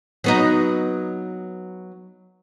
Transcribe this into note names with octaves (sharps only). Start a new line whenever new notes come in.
F#3 B3 D#4